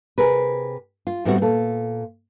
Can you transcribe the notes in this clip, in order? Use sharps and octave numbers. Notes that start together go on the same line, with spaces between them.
C3 G#4 A#4 B4
F4
A2 G3 B3 C4 F4 F#4
A#2 A4